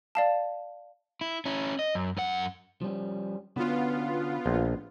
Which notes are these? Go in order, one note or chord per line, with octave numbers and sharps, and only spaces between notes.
D5 F5 A5
E4
C#4 E4
D#5
F#2
F#2 F#5
F3 G3 C#4
D3 B3 C#4 F4 F#4
A#1